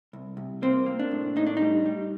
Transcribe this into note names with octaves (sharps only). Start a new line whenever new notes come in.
C2
C2
A#3 C4
A#3
D4
A2
A2 D#4
D4
G3 D#4
G3